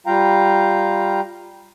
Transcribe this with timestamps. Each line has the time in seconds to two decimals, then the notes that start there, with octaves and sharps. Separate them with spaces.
0.07 G3 F4 F5 G5 A#5